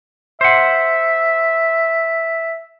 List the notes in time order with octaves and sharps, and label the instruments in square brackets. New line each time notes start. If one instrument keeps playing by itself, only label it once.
[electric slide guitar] C5 F#5 [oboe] E5